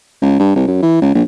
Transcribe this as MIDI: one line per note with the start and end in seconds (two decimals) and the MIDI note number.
0.22 0.36 37
0.39 0.51 43
0.56 0.66 36
0.67 0.80 42
0.82 0.99 52
1.01 1.11 37
1.14 1.22 34